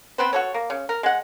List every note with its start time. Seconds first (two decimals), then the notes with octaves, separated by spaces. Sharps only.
0.18 B3 C4 B4 C5
0.33 F#4 A4 C#5
0.54 A#3
0.70 C#3
0.89 A#4
1.03 G#3 F#5